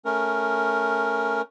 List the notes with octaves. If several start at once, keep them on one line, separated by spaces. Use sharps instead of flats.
A3 C#4 A#4